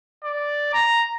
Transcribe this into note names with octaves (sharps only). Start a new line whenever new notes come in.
D5
A#5